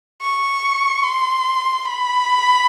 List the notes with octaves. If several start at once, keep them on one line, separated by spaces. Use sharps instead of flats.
C#6
C6
B5